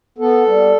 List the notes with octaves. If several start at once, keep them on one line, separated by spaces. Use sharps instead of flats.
B3 A4
G3